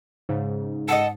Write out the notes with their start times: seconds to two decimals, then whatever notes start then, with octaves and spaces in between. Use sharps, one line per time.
0.29 G#2 C#3
0.88 A4 D#5 F#5